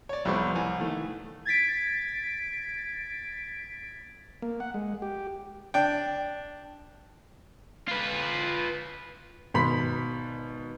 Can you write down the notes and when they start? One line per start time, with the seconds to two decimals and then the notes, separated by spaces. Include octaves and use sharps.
0.09 C#5 D5
0.25 C2 F2 G3 B3 C4 C#6
0.55 C2 G#5
0.79 D#3 E3 A3
1.45 G#6 A6 B6 D7
4.42 A#3
4.60 F#5
4.74 G#3
5.02 G4
5.74 D4 G5
7.88 F4 B4
9.54 G#1 B2 B5 C6 B6